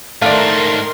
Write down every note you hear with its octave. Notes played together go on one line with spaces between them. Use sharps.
G#2 D#3 A3 D4 A#4 D5 F5 C6